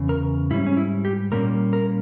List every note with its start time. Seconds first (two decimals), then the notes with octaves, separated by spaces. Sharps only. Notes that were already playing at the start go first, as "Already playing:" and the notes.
Already playing: E2 C#3
0.09 A#4
0.51 G#2 G3 C#4 E4
0.67 C#4
0.77 E4
1.05 G4
1.32 A#2 G3 A#3 C#4 A#4
1.73 A#4